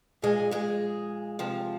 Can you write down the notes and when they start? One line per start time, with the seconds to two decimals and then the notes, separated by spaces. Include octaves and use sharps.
0.22 A#2 F3 G#3 G#4
0.51 G#3 G#4
1.39 C3 F3